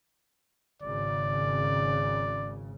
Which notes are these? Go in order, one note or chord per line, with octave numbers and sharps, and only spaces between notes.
G#1 C#3 D5